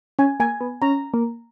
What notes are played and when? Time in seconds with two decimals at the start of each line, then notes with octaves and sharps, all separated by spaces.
0.19 C#4 G#5
0.40 A#3 G#5
0.61 B3
0.82 C#4 A#5
1.14 A#3